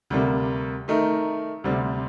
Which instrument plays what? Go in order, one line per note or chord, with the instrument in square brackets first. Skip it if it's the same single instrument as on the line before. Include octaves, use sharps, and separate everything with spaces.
[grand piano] D2 C3 G3 A#3
D#3 A3 D#4 A#4
D2 C3 G3 C4